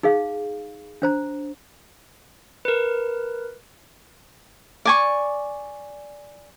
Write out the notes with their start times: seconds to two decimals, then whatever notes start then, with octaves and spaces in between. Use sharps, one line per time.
0.03 D#4 G#4 F5
1.02 D4 C5 A#5
2.65 A#4 B4
4.85 D5 G#5 C#6